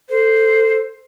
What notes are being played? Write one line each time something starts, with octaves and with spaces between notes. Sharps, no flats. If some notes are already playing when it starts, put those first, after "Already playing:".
A4 C5